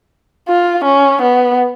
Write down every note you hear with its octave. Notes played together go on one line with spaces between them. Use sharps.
F4
C#4
B3